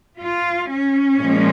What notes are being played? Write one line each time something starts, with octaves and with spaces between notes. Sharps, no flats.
F4
C#4
A#2 F3 G#3